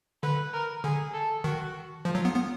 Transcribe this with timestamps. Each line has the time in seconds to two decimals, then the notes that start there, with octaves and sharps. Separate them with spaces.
0.23 D3 B4
0.53 A#4
0.84 D3 G#4
1.14 A4
1.44 D#3 F#4
2.05 F3 F4
2.15 F#3
2.25 B3
2.35 B3